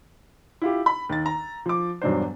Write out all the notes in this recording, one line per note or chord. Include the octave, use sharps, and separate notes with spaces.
E4 F4 G4
B5
D#2 A6
A#5
F3 D6
E1 G2 F#3 D4 C5